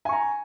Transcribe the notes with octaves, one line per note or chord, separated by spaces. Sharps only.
G#5 A#5 C#6